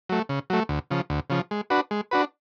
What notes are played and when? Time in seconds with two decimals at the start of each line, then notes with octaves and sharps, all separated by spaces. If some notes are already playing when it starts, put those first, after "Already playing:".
0.09 F#3 A3
0.29 C#3
0.50 F#3 A3
0.69 D2
0.91 C#3 F3
1.10 D2
1.30 C#3 F3
1.51 G#3
1.70 D4 F#4 B4
1.91 G#3
2.11 D4 F#4 B4